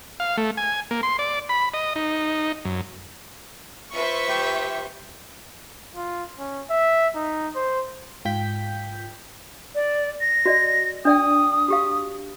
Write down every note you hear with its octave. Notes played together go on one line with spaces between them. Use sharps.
F5
A3
G#5
A#3
C6
D5
B5
D#5
D#4
F#2
F4 B4 C5 E5 C#6
G4
F4
C#4
E5
D#4
C5
G#2 F4 G5 G6 B6
D5
A#6
F#4 D5 D#5
D4 D5 G5 D#6
F#4 G4 F5